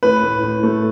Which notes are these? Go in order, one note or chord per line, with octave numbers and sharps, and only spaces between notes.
A2 B4
A2
A2
A3